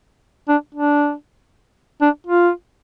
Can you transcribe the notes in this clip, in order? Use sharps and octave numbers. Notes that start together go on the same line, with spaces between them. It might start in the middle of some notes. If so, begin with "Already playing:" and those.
D4
D4
D4
F4